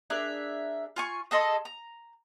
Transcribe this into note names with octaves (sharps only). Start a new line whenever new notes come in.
D4 G#4 A#4 E5
F4 G#5 C#6
G#4 A4 D#5 C6
A#5